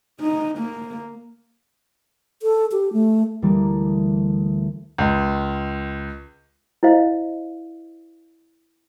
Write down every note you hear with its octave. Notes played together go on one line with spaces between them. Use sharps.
D#4
A#3
A4
G4
A3
D2 E3 G3 A#3
C#2
E4 C5 D#5 F5